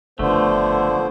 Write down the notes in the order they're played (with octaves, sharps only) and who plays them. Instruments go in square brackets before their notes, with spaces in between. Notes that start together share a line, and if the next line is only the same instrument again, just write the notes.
[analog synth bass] F#1 [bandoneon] D3 [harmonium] F3 B3 C5 [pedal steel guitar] A3